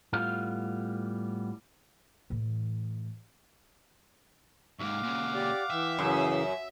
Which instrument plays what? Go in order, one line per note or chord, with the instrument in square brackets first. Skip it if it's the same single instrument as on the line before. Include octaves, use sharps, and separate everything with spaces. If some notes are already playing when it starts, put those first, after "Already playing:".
[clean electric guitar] A2 G3 B3 F4 F5
[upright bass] A2 E3
[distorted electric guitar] D#2 G#2 [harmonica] F5 F#5 D6
[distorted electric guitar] A#2 C#3
[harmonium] G4 D5
[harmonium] E3 G5 [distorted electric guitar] E5
[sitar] F#2 [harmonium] C#3 E3